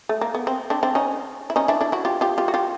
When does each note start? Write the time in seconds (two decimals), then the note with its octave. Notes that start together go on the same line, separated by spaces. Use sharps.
0.09 A3
0.21 A#3
0.35 B3
0.47 C4
0.70 C4 D4
0.83 C4 D4
0.95 C#4 D#4
1.50 E4
1.56 C#4 D#4
1.68 D4 E4
1.81 D4 E4
1.92 E4 F#4
2.05 F4 G4
2.21 F4 G4
2.38 F4 G4
2.48 F#4
2.54 F4 G4